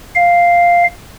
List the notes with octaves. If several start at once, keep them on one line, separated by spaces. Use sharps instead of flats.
F5